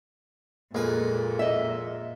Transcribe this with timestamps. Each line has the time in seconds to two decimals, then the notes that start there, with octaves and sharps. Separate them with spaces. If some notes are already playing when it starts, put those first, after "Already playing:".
0.75 F2 A#2 G#3 A#3 B4 G#5
1.39 D#5 E5